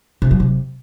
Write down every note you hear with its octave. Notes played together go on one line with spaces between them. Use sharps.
C3
F#3
C3